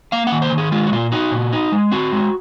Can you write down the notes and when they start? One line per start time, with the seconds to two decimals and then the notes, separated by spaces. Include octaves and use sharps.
0.12 A#3 F5
0.27 F#5
0.32 D#3
0.42 C5
0.52 D#3
0.58 G#4
0.72 G#3 F4
0.87 F#4
0.92 A#2 F4
1.12 D#4 F#4
1.32 A#2
1.53 D#4
1.72 G#3
1.91 C4 F#4
2.13 G#3